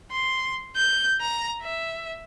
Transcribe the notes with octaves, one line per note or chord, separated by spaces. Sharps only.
C6
G6
A#5
E5